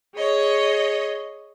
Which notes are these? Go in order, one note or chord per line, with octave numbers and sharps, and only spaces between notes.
G#4 C#5 D#5